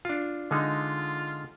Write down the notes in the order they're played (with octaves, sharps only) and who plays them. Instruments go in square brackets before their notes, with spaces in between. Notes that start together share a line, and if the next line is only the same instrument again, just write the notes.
[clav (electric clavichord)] D4 F4
[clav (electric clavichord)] D3 G#3 D#4 [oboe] F4